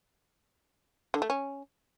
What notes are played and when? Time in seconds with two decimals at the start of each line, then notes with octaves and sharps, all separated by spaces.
1.14 D3
1.22 A3
1.30 C#4